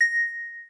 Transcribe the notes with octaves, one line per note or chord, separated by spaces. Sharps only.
A#6